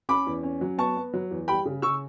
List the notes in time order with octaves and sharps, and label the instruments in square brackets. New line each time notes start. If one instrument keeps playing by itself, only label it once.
[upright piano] C#4 B5 D6
E2
C#4
F#3
B3 A5 C#6
B3
F#3
E2
G3 G5 B5
C#3
C#3 C#6 E6